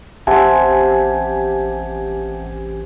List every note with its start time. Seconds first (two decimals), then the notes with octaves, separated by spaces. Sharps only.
0.27 A1 C4 G4 E5 F#5 G#5 A5